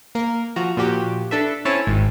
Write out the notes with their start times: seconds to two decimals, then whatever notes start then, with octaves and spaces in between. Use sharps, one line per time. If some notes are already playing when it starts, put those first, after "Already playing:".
0.15 A#3 A#4
0.56 F3 F#4 A#5
0.77 A#2 F3 F#4 G4
1.31 D4 A4 B4 E5
1.65 C4 C#4 E4 C#5 A5
1.87 G#1